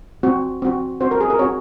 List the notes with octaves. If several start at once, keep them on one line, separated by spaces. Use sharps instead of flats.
C4 F#4
C4 F#4
C4 F#4 C5
A#4
G#4
A#4
C4 F#4 C#5